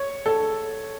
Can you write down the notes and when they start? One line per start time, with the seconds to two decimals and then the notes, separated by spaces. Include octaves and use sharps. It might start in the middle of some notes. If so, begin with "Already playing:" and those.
Already playing: C#5
0.26 A4